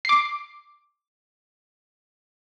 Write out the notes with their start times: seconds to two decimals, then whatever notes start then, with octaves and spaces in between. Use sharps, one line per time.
0.05 D6 C7